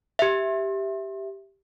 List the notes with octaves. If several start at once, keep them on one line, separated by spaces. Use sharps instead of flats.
G4 E5